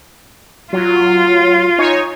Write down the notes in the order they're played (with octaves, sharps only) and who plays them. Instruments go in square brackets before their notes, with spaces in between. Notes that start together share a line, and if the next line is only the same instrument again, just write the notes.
[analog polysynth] F#3 [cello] F4
[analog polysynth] D#4 C#5 G#5